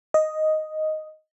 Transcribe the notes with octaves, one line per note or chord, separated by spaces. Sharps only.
D#5